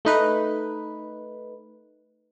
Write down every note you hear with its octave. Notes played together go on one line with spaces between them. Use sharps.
A3 D#4 B4